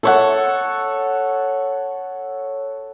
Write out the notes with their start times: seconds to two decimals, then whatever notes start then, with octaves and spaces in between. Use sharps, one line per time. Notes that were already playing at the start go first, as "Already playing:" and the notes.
0.03 A4 C#5 F#5